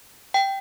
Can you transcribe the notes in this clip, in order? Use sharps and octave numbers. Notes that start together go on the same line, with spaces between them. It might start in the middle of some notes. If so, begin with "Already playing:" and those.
G5